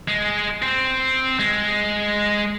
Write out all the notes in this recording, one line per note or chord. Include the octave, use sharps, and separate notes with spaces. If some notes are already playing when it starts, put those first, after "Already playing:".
G#3
C4
G#3